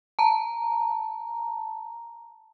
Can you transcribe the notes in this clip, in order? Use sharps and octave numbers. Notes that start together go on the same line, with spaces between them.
A5 A#5